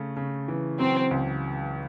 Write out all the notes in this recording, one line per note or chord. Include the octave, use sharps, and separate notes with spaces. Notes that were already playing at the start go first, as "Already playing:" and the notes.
Already playing: C#3 A3
C#3
E3
F#3 C4
C#2